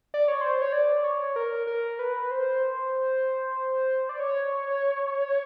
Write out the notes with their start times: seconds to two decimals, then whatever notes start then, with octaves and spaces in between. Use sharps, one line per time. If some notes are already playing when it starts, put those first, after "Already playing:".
0.14 D5
0.28 C#5
0.41 C5
0.62 C#5
0.72 D5
1.04 C#5
1.36 A#4
1.67 A#4
1.99 B4
2.31 C5
4.09 D5
4.20 C#5